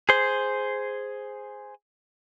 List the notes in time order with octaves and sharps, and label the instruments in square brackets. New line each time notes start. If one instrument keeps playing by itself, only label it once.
[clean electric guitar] G#4 C5